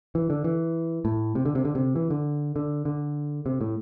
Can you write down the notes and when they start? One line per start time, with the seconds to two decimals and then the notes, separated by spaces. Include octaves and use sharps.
0.15 E3
0.30 D3
0.44 E3
1.05 A2
1.35 C3
1.45 D3
1.55 C3
1.65 D3
1.75 C3
1.96 E3
2.10 D3
2.56 D3
2.85 D3
3.46 C3
3.61 A2